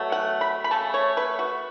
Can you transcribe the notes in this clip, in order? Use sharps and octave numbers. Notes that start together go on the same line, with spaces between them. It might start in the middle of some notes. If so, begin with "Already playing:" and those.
Already playing: B2 F#3 A3
F#5
B5
B5
C#3 A3 A5
C#5
B4
F#4